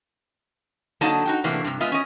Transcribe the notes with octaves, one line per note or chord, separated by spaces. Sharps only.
D3 F#3 A#3 D#4 D#5 A5
D#4 F#4 G5
A2 C3 E3 A3 A#3 D4
G2 C3
G#3 B3 F4 D#5 E5
C#4 D#5